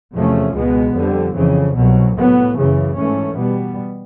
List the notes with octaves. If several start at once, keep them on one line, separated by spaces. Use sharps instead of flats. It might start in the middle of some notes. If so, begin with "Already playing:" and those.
E2 C3 F3 A3 C#4
C#2 B2 G#3 B3
F2 D3 G3
F2 C#3 E3
C2 B2 F#3
A2 F#3 B3
F#2 C#3 E3
G#2 E3 A3 C#4
B2 G3 B3